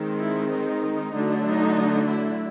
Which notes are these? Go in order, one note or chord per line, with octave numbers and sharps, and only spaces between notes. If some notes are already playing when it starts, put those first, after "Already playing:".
Already playing: D#3 G#3 C4
E4
D#4
D3 F#3 A3 D4
D#4
E4